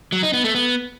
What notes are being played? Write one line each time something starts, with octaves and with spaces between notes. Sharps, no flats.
F#3
D#4
B3
A3
B3